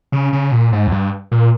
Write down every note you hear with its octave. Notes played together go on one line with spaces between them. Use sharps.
C#3
C#3
A#2
G#2
E2
G2
A#2